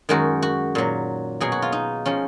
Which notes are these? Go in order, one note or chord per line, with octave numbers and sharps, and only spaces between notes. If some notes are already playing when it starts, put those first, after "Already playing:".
F#2 D#3 G#3 F#4
F#4
A#2 F#3
B2 F#3 G#4
F#4
F4
D#4
F3 G#3 C#4